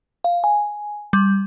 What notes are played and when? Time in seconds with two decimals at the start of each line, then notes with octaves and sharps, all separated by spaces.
0.24 F5
0.44 G#5
1.13 G3